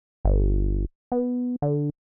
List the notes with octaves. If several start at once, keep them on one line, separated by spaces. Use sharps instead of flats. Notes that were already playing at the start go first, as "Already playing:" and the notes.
G1
B3
D3